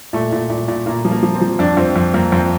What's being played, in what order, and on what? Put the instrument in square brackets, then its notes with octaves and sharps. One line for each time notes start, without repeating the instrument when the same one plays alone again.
[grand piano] A#2 A3
A#2
A#2
A#2
A#2 A#3
F3
A#3
F3
C4
F3
F2 D4
F2 C4
F2
F2 A#3
F2 C4